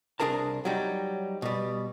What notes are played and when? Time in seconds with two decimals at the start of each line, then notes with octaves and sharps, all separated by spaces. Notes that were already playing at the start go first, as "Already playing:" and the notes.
0.20 C2 G#2 D4 G#4 A#4 A5
0.65 F#3 G3 D#4
1.42 B2 G3